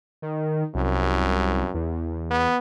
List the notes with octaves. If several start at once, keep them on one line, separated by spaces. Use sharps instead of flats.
D#3
C2 F#2
E2
B3